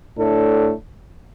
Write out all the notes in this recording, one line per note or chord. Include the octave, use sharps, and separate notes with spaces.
A2 A3 D4 A4